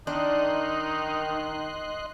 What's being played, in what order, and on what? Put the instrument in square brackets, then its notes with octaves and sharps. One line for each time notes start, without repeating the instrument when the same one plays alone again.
[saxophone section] D#3 [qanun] D4 [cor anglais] D#4 [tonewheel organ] D#5 C6 F#6